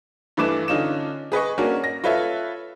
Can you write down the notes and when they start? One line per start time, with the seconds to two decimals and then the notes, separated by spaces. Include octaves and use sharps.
0.37 G2 E3 A3 B4 D6 E7
0.68 D3 C#4 D#4 F4 E7
1.32 G#4 B4 D#5 C#6
1.58 A#3 C#4 D4 F#4 A#4
1.84 A#6
2.04 F4 A4 B4 C#5 E5